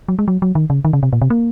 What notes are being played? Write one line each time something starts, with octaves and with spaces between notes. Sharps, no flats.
F#3
G#3
F#3
F#3
D#3
C#3
D#3
C#3
C3
A#2
C3
A#3